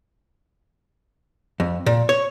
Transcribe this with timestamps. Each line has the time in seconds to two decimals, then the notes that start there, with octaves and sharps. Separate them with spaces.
1.60 F2
1.86 A#2
2.09 C#5